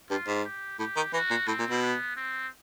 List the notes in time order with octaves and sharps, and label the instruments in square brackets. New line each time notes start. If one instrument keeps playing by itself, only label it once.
[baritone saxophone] G2 [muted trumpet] F4
[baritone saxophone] G#2
[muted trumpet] G4
[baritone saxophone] A2 [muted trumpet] G4
[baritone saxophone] D#3
[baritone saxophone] E3 [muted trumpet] F#4
[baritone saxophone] A#2
[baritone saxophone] A2 [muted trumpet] C4
[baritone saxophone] A#2
B2
[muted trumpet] B3
C4